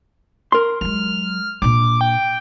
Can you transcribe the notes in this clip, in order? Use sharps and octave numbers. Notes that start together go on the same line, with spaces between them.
A#4 C6
F#3 G#3 F6
A#2 D4 D6
G5